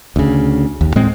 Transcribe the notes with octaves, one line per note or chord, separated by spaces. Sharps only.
D2 C#3
D#2
A2 G#3 C4